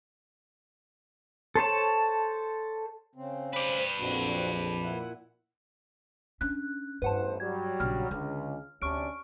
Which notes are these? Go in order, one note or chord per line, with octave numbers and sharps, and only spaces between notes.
A4 C5 C#5 A5
C#3 C4
B4 C5 D5
A#1 F2 C4 D4 F#4
A#2 E4 F#5
C#4 D4 F#6
A1 E2 G2 B4 C5 F#5 A5
F#3 G3 G#6
A#1 C#3 F6
C#2 D3
D2 C3 C#4 D4 C#6 F6 D7